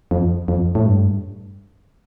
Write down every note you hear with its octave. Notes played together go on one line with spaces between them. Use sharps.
F2
F2
A2
G2